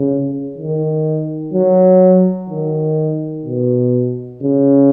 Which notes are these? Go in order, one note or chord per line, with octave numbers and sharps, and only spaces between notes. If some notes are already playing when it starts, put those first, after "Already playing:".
Already playing: C#3
D#3
F#3
D#3
B2
C#3